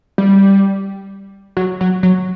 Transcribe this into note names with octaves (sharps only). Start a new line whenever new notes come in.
G3
F#3
F#3
F#3